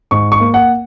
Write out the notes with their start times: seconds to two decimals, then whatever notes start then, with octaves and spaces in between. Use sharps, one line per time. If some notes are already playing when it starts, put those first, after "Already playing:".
0.11 G#2 C#6
0.32 C#6
0.40 A#3
0.54 F#5